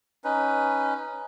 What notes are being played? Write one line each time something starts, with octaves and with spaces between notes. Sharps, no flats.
C#4 D#4 B4